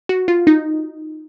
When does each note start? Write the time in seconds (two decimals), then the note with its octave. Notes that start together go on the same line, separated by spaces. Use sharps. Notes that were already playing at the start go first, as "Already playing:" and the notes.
0.09 F#4
0.28 F4
0.47 D#4